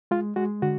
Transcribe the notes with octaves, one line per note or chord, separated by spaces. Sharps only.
G#3 F4
G#3 F#4
D3 F#4